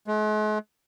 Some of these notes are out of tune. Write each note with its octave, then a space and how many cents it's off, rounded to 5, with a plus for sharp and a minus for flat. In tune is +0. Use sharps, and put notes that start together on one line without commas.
G#3 +45